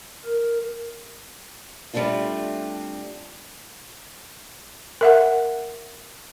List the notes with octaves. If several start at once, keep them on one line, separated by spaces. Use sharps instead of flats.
A#4
G3 A3 C4 D4 F4
A#4 E5 F#5